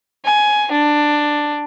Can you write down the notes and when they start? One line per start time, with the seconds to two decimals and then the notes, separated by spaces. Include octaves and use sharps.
0.25 G#5
0.72 D4